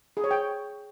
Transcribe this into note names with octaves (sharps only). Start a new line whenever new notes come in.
G#4
C#5
G5